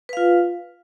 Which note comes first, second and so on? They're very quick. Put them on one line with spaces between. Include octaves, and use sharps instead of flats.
B4 F5 F4